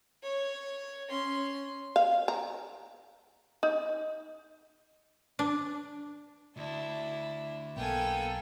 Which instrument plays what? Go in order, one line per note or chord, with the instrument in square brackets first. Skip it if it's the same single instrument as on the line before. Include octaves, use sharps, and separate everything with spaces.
[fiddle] C#5
C#4 C6
[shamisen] F5
A#5
D#4
[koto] D4
[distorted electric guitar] D2 [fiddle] D4 E4
[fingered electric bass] B1 [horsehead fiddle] A#3 A4 [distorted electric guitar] B3 [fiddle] G5 G#5